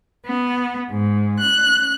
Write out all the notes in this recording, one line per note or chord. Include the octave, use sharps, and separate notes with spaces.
B3
G#2
F#6